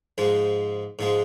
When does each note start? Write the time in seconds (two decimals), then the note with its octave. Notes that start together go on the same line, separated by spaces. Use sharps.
0.18 G#2 F3 G#3
0.99 G#2 F3 G#3